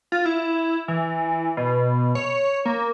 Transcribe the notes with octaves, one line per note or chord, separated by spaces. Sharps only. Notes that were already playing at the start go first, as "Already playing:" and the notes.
F4
E4
E3
B2
C#5
A#3